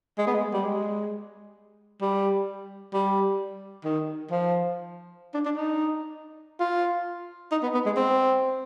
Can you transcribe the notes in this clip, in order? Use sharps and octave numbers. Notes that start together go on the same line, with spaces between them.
G#3
B3
G#3
G3
G#3
G3
G3
D#3
F3
D4
D4
D#4
F4
D#4
B3
B3
G#3
C4